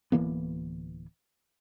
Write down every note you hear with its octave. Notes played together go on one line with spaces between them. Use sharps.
D1 E3 A#3 B3